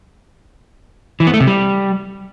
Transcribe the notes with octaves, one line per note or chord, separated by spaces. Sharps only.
E3
B3
A3
C3
G3